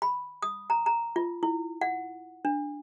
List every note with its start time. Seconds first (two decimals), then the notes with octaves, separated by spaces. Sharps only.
0.02 B5
0.42 D#6
0.70 A#5
0.86 A#5
1.16 F4
1.43 E4
1.81 F#5
2.45 D4